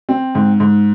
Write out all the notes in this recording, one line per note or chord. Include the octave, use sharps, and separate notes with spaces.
C4
G#2
G#2